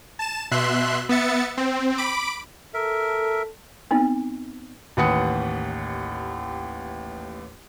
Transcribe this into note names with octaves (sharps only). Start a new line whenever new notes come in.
A5 E7
B2 E5 C6 F#6
B3 E5 A6 C#7
C4
B5 D6 D7
A4 A#4 E5
B3 C4 D#4
A1 D#2 B4 F#5 D#6 C#7